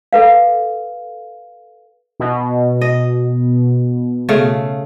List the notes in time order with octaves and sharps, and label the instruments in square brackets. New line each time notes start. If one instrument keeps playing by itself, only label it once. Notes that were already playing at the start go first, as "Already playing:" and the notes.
[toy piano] A4 B4 F5
[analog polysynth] B2
[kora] D#5
C#3 A3 F5